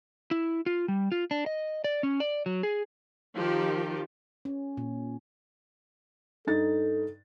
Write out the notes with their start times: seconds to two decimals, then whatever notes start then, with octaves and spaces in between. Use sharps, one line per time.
0.31 E4
0.66 F4
0.88 G3
1.12 F4
1.31 D4
1.46 D#5
1.84 D5
2.03 C#4
2.20 D5
2.46 F#3
2.63 G#4
3.33 D#3 F3 G4
4.45 C#4
4.77 A#2
6.47 G2 D#4 A4 A6